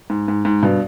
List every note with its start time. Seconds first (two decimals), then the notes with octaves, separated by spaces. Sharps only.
0.10 G#2
0.28 G#2
0.45 G#2
0.63 G2 B2